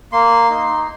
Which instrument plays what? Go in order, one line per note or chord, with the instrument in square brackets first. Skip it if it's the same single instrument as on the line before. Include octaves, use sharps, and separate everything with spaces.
[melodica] A#3 C6
D#4